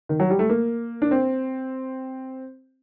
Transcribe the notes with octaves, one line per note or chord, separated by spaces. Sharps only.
D#3
F#3
G3
A3
A#3
D4
C4